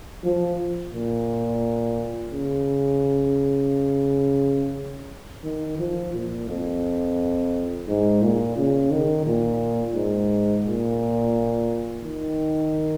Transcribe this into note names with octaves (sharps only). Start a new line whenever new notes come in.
F3
A#2
C#3
D#3
F3
A#2
F2
G#2
A#2
C#3
D#3
A#2
G#2
A#2
D#3